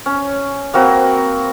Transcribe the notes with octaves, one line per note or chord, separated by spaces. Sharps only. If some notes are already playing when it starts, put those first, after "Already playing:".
C#4
A#3 C4 F#4 B4